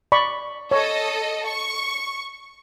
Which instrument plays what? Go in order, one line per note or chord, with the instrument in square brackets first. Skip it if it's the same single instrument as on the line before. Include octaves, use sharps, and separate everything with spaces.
[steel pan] D5 B5 C#6
[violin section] A4 D#5 [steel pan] C#5
[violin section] C#6